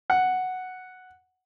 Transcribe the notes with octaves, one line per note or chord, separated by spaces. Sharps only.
F#5